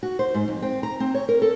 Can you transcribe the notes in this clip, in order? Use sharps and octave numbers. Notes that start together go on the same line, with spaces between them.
F#4
C5
G#2
F2
C4
A#5
C4
C#5
A#4
A4